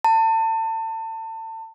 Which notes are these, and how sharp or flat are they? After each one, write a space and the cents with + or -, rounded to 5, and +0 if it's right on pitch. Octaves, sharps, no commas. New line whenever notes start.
A5 +30